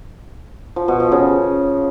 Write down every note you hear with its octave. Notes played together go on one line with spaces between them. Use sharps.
F3
B2
F3
C#3